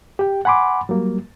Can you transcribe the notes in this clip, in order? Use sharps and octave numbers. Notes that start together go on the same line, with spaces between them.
G4 G5
F#5 G#5 B5 C6 D6
F#3 G3 A#3